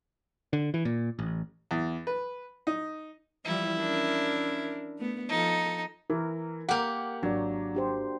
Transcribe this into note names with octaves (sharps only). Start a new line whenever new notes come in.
D3
E3
A#2
A1
E2
B4
D#4
E3 F3 G3 E4
C#4 D4 A#4
A3 B3
F3 D#4 A4
E3 A#4
A#3 G4 F#5
G#1 F#3 D4 F#4 D5
D4 G4 C5